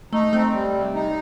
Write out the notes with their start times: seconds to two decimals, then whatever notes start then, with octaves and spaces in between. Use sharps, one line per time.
0.13 A3 D#4
0.33 A3 C4
0.53 G3
0.74 C3
0.94 D#4